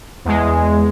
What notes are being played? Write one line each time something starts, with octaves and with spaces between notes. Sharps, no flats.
E2 G#3